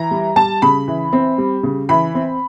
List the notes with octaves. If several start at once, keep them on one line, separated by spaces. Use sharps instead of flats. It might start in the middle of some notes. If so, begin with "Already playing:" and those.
Already playing: E3 A#5
G3
G3 A5
C#3 B5
E3
C4
G3
C#3
E3 B5
C4